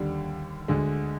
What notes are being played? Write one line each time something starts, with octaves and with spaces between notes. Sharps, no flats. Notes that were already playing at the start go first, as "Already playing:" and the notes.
Already playing: D#2 D3 G3
D2 D3 G#3